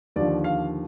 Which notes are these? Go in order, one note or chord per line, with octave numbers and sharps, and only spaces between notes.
D#2 D3 F3 D5
F5